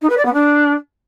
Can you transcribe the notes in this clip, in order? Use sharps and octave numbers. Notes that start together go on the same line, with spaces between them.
D#4
B4
D5
B3
D4